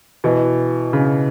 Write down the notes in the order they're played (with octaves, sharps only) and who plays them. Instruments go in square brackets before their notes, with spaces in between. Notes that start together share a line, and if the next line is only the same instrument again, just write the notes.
[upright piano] B2 E3
C#3